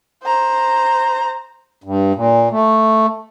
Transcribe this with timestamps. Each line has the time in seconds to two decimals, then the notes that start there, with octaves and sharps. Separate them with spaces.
0.23 C5 A#5
1.84 G2
2.15 A#2
2.51 A3